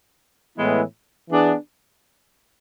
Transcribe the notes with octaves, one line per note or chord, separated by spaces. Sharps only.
A2 E3 G#3 B3 E4
E3 B3 D4 G#4